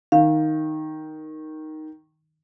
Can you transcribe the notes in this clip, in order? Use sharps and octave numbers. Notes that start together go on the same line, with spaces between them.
D#3 F5